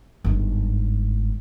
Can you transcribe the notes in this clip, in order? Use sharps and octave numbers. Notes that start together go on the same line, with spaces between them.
G1 G#2